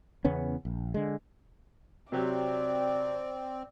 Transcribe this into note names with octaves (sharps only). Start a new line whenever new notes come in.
E2 C#3 B3 C#4
A#1
D3 G#3
C3 F#3 C4 G4 D5